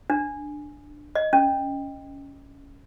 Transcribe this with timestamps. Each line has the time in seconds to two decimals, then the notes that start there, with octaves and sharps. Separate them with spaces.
0.10 D4
1.15 D#5
1.33 C#4